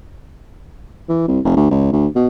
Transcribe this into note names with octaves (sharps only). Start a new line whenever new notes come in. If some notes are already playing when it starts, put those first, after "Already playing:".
E3
C2
F1
D2
C#2
D2
B2